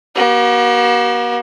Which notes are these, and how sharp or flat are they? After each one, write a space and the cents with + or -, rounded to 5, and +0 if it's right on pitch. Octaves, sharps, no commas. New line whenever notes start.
A#3 +45 F#4 +45